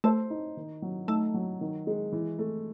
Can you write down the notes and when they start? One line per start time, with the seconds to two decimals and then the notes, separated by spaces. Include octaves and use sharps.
0.04 A3 C5
0.30 D#4
0.57 D#3
0.82 F#3
1.08 A3 D#4
1.34 F#3
1.61 D#3
1.87 G#3
2.13 E3
2.39 A3